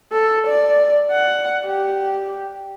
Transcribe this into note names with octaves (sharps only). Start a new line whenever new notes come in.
A4
D5
F#5
G4